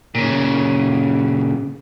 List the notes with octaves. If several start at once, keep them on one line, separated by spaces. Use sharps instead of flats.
A#2 C#3